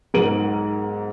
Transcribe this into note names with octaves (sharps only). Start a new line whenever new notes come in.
B1 G#2 A#4 D7 D#7 F#7